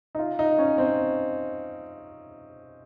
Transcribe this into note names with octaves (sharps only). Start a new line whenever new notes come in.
D#4
F4
D#4
C#4
C4